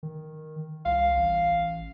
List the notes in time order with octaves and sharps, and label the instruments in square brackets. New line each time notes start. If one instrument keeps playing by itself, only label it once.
[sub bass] D#3
[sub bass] C2 [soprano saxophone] F5
[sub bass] A1